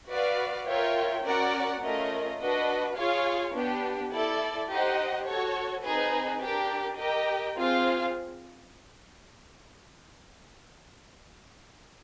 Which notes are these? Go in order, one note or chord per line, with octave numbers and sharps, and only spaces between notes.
F#4 B4 D5 F5
F4 A#4 C#5 E5 G5
C#4 F#4 A#4 D5 F#5
A3 C#4 F4 A#4 D#5
D4 F#4 B4 D#5
F4 G#4 C#5 F5
B3 D4 G4
E4 A4 D5
D#4 G4 C5 D#5 F#5
F#4 A4 C#5
C4 D#4 G#4 B4
D4 G4 A#4
G4 A#4 D#5 G5
C4 F4 G#4 C5 F5